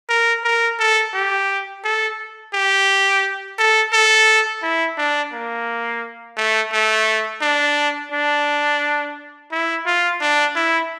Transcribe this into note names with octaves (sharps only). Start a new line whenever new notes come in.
A#4
A#4
A4
G4
A4
G4
A4
A4
E4
D4
A#3
A3
A3
D4
D4
E4
F4
D4
E4